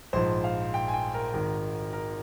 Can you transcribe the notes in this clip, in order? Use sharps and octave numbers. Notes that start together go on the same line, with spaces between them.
A#1 G#2 F3 C5
F5
G5
G#5
G5
A#4
G#1 G#2 D#3 A#4
A#4